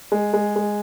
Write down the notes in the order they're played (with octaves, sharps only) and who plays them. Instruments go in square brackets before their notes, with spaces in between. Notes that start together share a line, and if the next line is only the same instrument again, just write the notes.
[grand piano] G#3
G#3
G#3